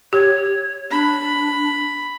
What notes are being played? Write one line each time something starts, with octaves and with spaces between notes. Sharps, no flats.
G4 C#5
D4 B5